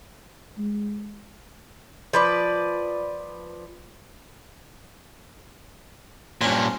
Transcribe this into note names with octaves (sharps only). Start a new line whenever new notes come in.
G#3
F3 B4 D5
G2 A#2 C#4 C5